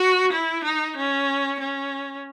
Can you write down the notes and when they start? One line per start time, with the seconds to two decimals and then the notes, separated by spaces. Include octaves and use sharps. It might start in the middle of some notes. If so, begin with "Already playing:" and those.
Already playing: F#4
0.32 E4
0.64 D#4
0.97 C#4
1.60 C#4